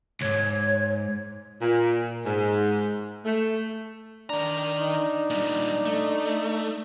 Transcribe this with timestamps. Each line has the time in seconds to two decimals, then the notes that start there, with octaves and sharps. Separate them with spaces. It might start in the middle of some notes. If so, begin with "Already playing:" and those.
0.21 C2 G#2 C#5 G#6
1.62 A#2
2.26 G#2
3.25 A3
4.30 D#3 D4 A#5
4.81 D#4
5.30 A#2 G3
5.86 A3